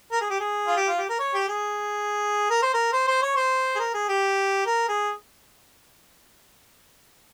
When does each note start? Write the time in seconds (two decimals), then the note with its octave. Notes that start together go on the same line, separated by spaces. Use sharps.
0.12 A#4
0.21 G#4
0.30 G4
0.40 G#4
0.67 F4
0.77 G4
0.88 F4
0.98 G4
1.09 A#4
1.20 C#5
1.34 G4
1.48 G#4
2.50 A#4
2.62 C5
2.74 A#4
2.93 C5
3.08 C5
3.22 C#5
3.37 C5
3.75 G#4
3.79 A#4
3.94 G#4
4.09 G4
4.66 A#4
4.89 G#4